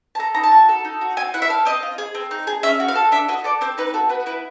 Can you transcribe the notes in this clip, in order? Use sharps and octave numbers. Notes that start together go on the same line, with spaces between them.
A5
A4 A#5
D#4 A#5
A5
F#4
A4
D#4
F#4
C4 G#5
E4 F#5
E5
A4 F5
C4 D#5
F4
G#4
C4
D#4
G#4
C#4 E5
F#4
F5
A4
D4 E5
F#4 D#5
A4 D5
C4 C5
D#4 B4
F#4 A4
B3 B4
E4 B4